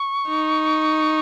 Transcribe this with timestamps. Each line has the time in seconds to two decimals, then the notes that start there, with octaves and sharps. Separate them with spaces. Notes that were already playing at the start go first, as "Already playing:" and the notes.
Already playing: C#6
0.28 D#4